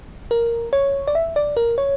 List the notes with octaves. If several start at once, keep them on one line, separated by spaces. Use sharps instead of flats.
A#4
C#5
D5
E5
D5
A#4
C#5